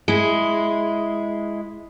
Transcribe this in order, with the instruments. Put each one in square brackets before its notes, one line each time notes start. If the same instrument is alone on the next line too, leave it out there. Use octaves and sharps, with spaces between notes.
[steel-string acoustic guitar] G#3 E4